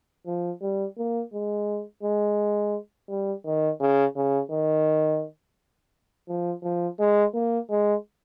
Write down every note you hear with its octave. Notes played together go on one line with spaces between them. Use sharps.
F3
G3
A#3
G#3
G#3
G3
D#3
C#3
C#3
D#3
F3
F3
G#3
A#3
G#3